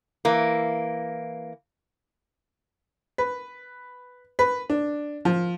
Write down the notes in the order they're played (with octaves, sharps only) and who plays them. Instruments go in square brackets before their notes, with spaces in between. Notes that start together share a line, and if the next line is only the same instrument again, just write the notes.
[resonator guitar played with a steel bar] E3 A#3
[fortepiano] B4
B4
D4
F3